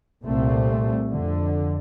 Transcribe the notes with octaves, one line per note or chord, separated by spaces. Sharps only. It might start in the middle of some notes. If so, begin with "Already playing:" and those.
C2 A#2 A3 C4
F2 D3